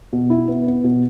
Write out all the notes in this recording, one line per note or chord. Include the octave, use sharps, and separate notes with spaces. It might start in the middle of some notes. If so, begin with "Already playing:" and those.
B2
E4
B3
B3
B2